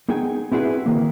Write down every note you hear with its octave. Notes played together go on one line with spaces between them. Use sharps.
B3 D#4 G#4 G5 G#5
C4 E4 F#4 G#4 B4
D#3 A#3